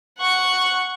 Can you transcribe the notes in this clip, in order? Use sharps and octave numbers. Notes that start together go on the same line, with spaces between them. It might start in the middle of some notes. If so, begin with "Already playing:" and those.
F#5 C#6